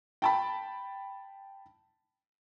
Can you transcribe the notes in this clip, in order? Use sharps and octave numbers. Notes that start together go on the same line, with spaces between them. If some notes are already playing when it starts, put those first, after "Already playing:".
G5 A5 B5